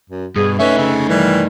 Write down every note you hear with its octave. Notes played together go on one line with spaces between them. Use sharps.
F#2
G2 B2 G#4
A3 C#4 D#4 B4 E5
C#3
D#3 E3 G3